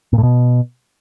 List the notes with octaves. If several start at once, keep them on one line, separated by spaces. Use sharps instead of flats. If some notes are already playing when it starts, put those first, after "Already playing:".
A#2
A2
B2